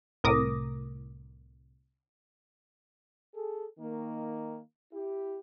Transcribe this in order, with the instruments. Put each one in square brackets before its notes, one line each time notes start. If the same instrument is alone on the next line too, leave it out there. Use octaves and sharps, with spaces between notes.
[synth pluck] C2 A2 A#4 D6 D#6 A#6
[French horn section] G#4 A4
D#3 A#3
E4 G4